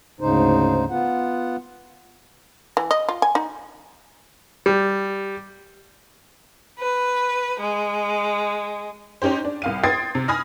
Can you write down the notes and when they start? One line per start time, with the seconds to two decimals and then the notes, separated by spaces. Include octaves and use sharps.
0.21 D2 G#2 C#3 D#4 C5
0.90 B3 F4 F#5
2.77 E3
2.91 D#5
3.09 F4
3.22 G#5
3.35 D#4
4.66 G3
6.80 B4
7.60 G#3
9.22 C#4 D#4 G4 C5
9.45 D4
9.62 C2 F5 D#7
9.84 G5 C6 D#6 G#6 A6 C7
10.15 C3
10.28 G#5 B5 D#6 F6 A#6